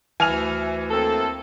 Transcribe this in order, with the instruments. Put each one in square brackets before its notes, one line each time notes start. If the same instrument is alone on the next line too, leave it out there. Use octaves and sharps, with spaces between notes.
[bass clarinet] D2 [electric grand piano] E3 [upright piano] G#5 F6 F7
[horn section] A#3 C4 A4